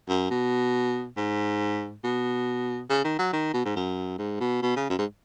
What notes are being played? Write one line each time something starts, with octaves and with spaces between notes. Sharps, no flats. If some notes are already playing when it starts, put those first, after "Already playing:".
F#2
B2
G#2
B2
C#3
D#3
F#3
D#3
B2
G#2
F#2
G#2
B2
B2
C#3
F#2
G#2